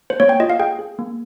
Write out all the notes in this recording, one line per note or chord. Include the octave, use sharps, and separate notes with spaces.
C5
A#3 C#5
G5
F4 D#5
F5
G#4 G5
G#4
A#3